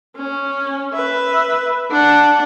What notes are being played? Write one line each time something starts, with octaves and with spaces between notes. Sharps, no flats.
C#4
B4 E5
D4 F#5